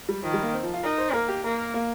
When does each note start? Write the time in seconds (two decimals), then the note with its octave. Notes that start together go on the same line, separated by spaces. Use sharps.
0.09 G3
0.23 D#3 F3
0.34 G3
0.43 A#3
0.54 C4
0.63 F3
0.74 F4
0.83 D#4 A#4
0.98 C5
1.13 A#3 A#4
1.28 G4
1.44 A#3 A#4
1.74 A#3